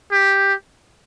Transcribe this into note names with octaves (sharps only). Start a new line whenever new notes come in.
G4